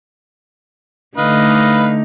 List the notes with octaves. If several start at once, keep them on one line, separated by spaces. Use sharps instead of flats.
D3 A3 D#4 B4 D#5 F5